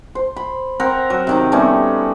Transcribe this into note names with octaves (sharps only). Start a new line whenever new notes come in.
C5
B5
C4 A#4 F#5
F#3
C3 D#3 D#4
G3 A3 B3 C#4